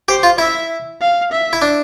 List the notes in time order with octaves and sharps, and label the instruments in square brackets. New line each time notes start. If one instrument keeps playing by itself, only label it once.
[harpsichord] G4 [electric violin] C5
[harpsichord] F4
[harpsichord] E4 [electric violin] E5
[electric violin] F5
E5
[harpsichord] E4
D4